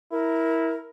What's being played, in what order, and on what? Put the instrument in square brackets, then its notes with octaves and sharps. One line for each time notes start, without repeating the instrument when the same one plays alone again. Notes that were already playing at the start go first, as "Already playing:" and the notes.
[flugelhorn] E4 [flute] A#4